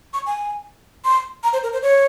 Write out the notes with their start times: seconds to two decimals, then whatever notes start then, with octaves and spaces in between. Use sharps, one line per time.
0.13 C#6
0.26 G#5
1.04 C6
1.43 A#5
1.53 C5
1.63 A#4
1.73 C5
1.82 C#5